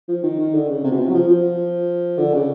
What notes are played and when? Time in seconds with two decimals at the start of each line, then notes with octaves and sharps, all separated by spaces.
0.08 F3
0.23 D#3
0.39 D#3
0.54 D3
0.68 C#3
0.84 C3
0.91 B2
0.98 C3
1.08 F#3
1.14 F3
1.28 F3
2.18 D3
2.34 C#3